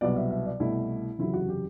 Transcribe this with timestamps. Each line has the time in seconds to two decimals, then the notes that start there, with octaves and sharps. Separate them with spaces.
0.01 C2 B2 F#3 B3 D5
0.16 E5
0.31 E5
0.45 D5
0.60 C2 B2 A3 E4
1.18 F#1 E2 C3 F#3 E4
1.34 F#4
1.49 G4